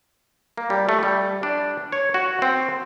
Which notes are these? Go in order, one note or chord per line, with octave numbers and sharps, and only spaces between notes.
A#3
G3
A3
G3
D4
C#5
F#4
C4